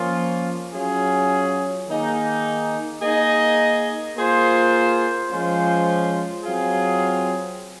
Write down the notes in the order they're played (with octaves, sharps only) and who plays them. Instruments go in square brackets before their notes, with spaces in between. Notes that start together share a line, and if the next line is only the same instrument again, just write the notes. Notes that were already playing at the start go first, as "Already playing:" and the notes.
Already playing: [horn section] F3 A#3 C#4 F4
F#3 C#4 F4 G#4
D#3 A#3 D#4 G#4
A#3 D#4 G#4 D#5
A#3 F4 G#4 C5
F3 G#3 C#4 F4 C5
F#3 C4 F4 G#4